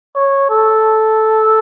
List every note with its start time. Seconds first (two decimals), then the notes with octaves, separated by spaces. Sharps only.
0.15 C#5
0.50 A4